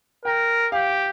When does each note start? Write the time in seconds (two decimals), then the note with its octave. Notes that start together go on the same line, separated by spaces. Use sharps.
0.25 A#4 G5
0.72 G4 F5